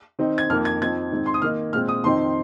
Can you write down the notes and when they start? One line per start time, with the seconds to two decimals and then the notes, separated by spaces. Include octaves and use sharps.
0.19 D#3 C4 D#4
0.38 G#6
0.50 F2 D#3 A#3 F6
0.65 G#6
0.80 F2 F3 C4 D#4 G#6
1.11 G#2 D#3 C4 D#4
1.26 C6
1.34 D#6
1.42 D#3 A#3 D#4 F6
1.73 A#2 G#3 C4 F6
1.89 D#6
2.04 F2 D#3 C4 D#4 C6